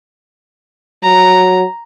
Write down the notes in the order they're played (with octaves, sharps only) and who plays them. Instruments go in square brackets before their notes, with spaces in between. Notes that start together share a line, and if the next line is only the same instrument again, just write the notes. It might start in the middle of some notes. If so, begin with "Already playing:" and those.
[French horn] F#3 [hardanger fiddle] A#5